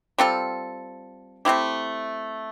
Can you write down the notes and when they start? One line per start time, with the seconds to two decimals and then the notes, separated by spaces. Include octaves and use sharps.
0.18 G3 C4 F4 A4
1.45 A3 C4 E4 G4